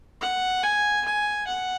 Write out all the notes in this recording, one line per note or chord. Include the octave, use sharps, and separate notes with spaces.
F#5
G#5
G#5
F#5